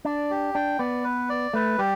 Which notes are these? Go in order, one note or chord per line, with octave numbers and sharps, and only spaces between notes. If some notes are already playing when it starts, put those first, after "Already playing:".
D4 D5
G4
D4 G5
B3 D5
B4
D5
A3 B4
G3 G4